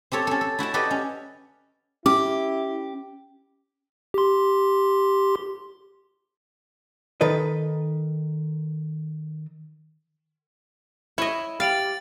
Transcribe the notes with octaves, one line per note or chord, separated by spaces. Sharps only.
C4 G4 A4 C#5
C#4 A4
A4
E4 F#4 G5 A5
F#4 G4 A4 B4 D5 D#5
C#4
C#4 E4 G4 D6
G4 C6
D#3 A4 B4 D#5
E4 C#5 D#5
G4 F5 A6 D7 F#7